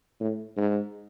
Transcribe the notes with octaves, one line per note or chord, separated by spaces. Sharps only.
A2
G#2